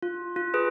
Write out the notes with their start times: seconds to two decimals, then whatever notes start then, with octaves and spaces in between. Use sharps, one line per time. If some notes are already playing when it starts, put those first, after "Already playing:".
0.03 F4
0.36 F4
0.54 G#4 B4